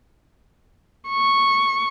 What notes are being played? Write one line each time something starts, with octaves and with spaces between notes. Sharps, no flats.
C#6